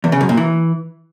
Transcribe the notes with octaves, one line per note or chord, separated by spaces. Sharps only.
E2
C#3
F#2
A#2
E3